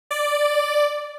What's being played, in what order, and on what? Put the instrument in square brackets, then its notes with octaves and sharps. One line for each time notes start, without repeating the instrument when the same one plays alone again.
[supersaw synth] D5